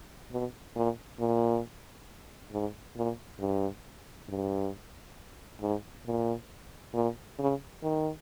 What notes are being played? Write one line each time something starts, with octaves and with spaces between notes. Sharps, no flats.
B2
A#2
A#2
G#2
A#2
G2
G2
G#2
A#2
A#2
C#3
D#3